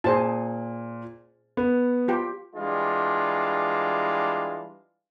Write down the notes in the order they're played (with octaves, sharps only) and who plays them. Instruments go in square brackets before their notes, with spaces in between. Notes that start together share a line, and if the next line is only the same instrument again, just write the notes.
[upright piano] A#2 [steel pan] G#4 C5 A5
[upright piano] B3
[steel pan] F4 G4 G5
[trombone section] E3 G3 G#3 D4 F4